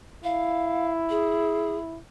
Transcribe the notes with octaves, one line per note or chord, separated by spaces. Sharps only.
E4 F5
G#4